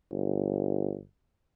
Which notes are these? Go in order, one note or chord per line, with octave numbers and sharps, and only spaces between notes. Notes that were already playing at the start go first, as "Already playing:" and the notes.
G1